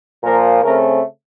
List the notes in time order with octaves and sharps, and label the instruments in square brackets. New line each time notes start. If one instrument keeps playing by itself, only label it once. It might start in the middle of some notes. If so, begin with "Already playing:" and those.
[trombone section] A#2 F3 A#3 A#4
C#3 A3 C4 A#4